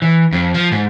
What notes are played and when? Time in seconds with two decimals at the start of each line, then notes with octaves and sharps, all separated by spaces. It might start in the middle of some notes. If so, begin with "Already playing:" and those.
0.02 E3
0.32 F2
0.54 F3
0.72 G#2